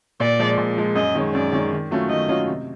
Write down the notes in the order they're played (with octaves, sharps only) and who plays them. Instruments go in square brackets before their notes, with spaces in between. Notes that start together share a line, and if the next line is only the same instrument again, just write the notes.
[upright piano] A#2 [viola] D5
[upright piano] F3 G#3
A#2
F3 G#3
[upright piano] F#2 [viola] D#5
[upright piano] D#3 G#3 C#4
[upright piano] F#2 [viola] D5
[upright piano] D#3 G#3 C#4
D#3
F#3 A3 C#4 F4
[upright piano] D#3 [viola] D#5
[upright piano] F#3 A3 C#4 F4
C3